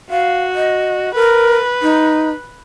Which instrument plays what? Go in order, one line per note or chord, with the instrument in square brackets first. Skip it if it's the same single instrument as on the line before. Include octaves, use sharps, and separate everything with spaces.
[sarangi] F#4 [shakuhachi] F5
[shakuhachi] D#5
[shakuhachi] A#4 [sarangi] B4
[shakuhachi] D#4